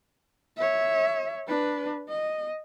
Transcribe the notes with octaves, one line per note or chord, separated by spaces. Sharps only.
C#5 E5
D4 B4
D#5